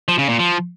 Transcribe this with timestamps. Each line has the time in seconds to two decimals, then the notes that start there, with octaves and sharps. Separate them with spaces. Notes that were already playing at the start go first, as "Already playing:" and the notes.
0.08 F3
0.19 C#3
0.29 A#2
0.39 F3